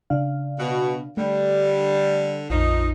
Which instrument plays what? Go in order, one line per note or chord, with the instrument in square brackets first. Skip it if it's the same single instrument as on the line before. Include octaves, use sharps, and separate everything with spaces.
[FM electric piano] C#3 D4 F5
[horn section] B2
[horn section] D3 G3 [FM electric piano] A3
[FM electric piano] A#1 F2 [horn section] F3 D#4